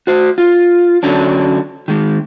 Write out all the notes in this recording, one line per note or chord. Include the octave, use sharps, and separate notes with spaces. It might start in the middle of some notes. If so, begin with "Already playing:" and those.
F#4 C5
F4
D3 F#3 C#4 D4
D#3 G#3